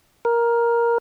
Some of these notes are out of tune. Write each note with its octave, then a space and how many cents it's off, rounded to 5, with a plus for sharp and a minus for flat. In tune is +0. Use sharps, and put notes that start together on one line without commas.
A#4 +10